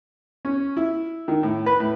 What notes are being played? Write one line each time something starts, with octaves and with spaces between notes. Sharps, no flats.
C#4
E4
D#3
A2
B4
A2